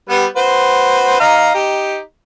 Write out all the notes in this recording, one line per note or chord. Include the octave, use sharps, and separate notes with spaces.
G3 B3 B4
F#4 B4 C5
D#4 F5 A#5
D#4 G4